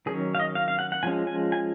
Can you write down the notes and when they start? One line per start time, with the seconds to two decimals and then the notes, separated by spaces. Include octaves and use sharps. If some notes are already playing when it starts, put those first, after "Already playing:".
0.06 D#3 F#3 C#4 G#4
0.35 F5
0.40 D#5
0.55 F5
0.68 F5
0.79 F#5
0.92 F#5
1.03 F3 G#3 C#4 G#5
1.27 G#5
1.52 G#5